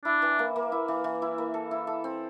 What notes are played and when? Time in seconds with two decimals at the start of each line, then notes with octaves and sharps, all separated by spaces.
0.05 D4 E4
0.22 E3
0.39 A#3
0.56 A#3
0.72 E4
0.88 E3
1.04 E3
1.22 E4
1.38 A#3
1.54 A4
1.71 E4
1.87 A4
2.04 C4